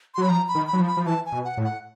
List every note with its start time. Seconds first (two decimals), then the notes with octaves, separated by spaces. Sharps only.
0.14 C6
0.18 F#3 B5
0.29 F3 A#5
0.48 B5
0.55 D#3
0.67 B5
0.73 F#3
0.80 F3
0.87 B5
0.97 F3
1.06 E3 A5
1.26 G#5
1.32 B2
1.45 F#5
1.57 A2
1.64 F#5